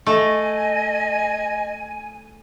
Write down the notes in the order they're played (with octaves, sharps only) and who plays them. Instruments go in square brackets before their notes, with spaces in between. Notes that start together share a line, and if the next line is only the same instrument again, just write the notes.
[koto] A3 [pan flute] D#5 [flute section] G#5